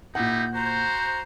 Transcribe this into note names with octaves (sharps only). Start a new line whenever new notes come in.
A#2 D#4 E4 G4 F#5 G6
F#4 C5 A#5